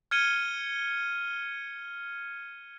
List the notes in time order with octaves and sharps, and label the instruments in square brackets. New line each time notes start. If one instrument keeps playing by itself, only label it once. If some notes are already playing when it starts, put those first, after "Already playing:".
[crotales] F6 G#6 C#7 D#7 G7